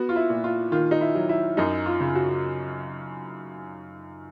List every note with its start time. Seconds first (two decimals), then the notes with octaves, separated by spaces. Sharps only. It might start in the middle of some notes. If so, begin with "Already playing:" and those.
Already playing: B3 F#4
0.09 F4
0.16 E4
0.30 A#2
0.44 F4
0.72 D#3 F4
0.91 D#4
1.01 E4
1.15 F#3
1.29 E4
1.57 F#2 D#4
1.86 F4
2.00 C#3
2.15 F#4